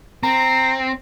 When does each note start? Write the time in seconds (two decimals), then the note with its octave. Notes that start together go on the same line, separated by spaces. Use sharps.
0.23 C4 A#5